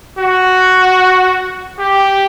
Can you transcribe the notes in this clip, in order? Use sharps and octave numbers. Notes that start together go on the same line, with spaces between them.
F#4
G4